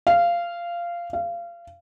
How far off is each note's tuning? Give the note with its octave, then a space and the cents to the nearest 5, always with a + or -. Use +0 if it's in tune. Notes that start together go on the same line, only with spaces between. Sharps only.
F5 -15
F5 -25